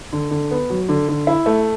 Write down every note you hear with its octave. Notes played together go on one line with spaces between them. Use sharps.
D3
D3
B3
F#3
D3
D3
E4
A3